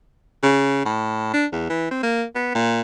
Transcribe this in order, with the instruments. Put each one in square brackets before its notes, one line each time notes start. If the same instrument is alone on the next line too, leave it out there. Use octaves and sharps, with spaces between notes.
[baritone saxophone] C#3
A2
D4
E2
E3
C4
A#3
B3
A#2